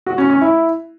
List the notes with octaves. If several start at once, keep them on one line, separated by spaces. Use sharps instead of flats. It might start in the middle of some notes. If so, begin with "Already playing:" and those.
F#4
C#4
C#4
E4